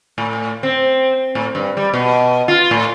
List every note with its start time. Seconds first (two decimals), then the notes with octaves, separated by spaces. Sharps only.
0.18 A2
0.63 C4
1.35 A2
1.55 G2
1.77 G3
1.94 B2
2.48 F4
2.71 A2